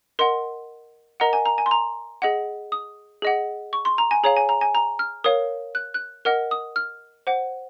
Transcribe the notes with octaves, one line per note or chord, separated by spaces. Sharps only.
A#4 D#5 F#5 C6
A#4 D#5 F#5 A#5
G#5
A#5
G#5
C6
A#5
G#4 D#5 F#5
D#6
G#4 D#5 F#5
C#6
C6
A#5
G#5
G#4 C#5 F5 A#5
G#5
A#5
G#5
A#5
F6
A#4 C#5 F5 D#6
F#6
F#6
A#4 D#5 F#5 F6
D#6
F6
C5 F#5